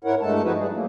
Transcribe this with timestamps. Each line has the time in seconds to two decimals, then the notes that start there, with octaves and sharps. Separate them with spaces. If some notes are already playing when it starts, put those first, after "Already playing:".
0.04 G#2 E4 A#4 C#5 F#5
0.21 G2 G#3 A3 A4 A5
0.43 F3 C4 D#4 E4 F#4 B4
0.57 E3 G3 G#4
0.72 F#3 A3 A#3